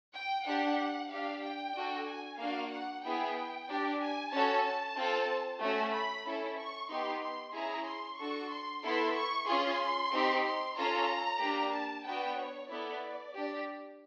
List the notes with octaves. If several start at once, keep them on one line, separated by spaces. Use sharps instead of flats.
G5
D4 G4 F#5
D4 G4 F5
G5
D4 F#4 A4
G#5
A#3 D4 F#4 F5
F#5
B3 E4 G#4 G5
D4 G4
G#5
C#4 F#4 A4 A5
A5
C4 F4 A4
A3 C#4 F#4
B5
C#4 E4 A4
C#6
B3 D#4 G4 C6
C6
C#4 E4 G#4 A#5
C6
D4 F#4 A4 C#6
C6
B3 E4 A4 C6
C#6
C#4 F4 G#4 C6
C4 D#4 G4
C6
C#4 F4 A4 A#5
A#3 D4 G4
A5
B3 D4 F#4 G5
C#5
B3 E4 A4 D5
D4 G4